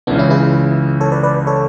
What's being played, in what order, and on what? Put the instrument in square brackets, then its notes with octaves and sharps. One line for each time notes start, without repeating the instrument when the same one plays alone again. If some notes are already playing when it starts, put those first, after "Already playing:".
[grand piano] C#2 C#3 E3 [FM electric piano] B3 D4
[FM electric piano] C#4 E4
E4 G#4
A4 C#5
B4 D5
B4 D5
A4 C#5